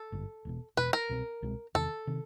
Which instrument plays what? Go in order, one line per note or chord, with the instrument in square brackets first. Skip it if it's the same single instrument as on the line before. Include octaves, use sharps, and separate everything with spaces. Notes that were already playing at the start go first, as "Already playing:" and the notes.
Already playing: [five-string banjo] A4
[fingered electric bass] G#1 G2 D3
E1 E2 B2
[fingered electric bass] E1 E2 B2 [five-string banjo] B4
[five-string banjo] A#4
[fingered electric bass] C2 B2 G#3 C4
C2 B2 G#3 C4
[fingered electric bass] E2 C3 D#3 [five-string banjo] A4
[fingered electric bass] C3 D#3